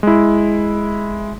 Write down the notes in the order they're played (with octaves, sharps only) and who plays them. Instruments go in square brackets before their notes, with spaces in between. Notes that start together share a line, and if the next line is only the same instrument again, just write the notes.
[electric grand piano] G#3 E4